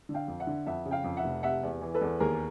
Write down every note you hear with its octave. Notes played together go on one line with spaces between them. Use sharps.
D3
F5 G5
F2
E5 F#5
D3
F2 E5 F#5
C#3
F5 G5
F2
E5 F#5
F1
C3 E5 F#5
E2
E3
A4 B4
E2
D#2 G#4 A#4